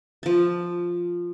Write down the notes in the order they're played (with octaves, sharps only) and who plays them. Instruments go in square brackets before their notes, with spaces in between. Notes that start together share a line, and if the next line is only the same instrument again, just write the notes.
[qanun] F3 A5